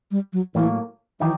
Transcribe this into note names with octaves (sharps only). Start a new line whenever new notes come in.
G3
F#3
A2 E3 F#3 A#3
D#3 E3 F#3 D#4 G4